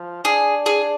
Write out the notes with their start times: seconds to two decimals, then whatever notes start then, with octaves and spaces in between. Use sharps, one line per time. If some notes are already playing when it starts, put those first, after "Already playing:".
Already playing: F3
0.25 D4 G#4
0.66 G#4